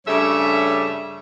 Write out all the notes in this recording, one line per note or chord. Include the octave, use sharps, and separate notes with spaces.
G2 C#3 G3 A3 C#5 E5